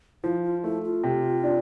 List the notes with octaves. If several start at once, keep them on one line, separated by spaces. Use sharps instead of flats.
F3 E4
F4
A3 E4
F4
C3
D4